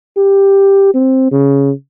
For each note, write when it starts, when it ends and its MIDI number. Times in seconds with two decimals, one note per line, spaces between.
0.17 0.94 67
0.94 1.29 60
1.32 1.71 49